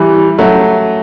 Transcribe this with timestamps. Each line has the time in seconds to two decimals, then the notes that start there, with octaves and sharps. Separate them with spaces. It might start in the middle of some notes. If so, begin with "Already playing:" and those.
Already playing: E3 G3
0.38 F#3 A3